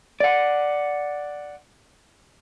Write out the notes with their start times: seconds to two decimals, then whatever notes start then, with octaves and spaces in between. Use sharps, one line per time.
0.20 D5 F#5